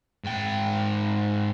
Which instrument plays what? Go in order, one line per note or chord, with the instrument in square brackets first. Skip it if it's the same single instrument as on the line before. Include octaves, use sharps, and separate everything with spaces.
[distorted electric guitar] G#2 G5